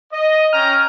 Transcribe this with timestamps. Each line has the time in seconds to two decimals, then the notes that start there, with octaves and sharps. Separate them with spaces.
0.12 D#5
0.53 C#4 G5 A#5 F6